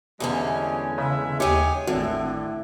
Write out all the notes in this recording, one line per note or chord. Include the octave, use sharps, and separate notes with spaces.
E2 D3 G3 G#3 C#4
C#3 G#3 E5
D#2 G#3 G4 G#4 C#5
G#1 A2 D3